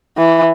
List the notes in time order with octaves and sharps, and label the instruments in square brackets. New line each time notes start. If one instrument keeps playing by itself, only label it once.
[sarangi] E3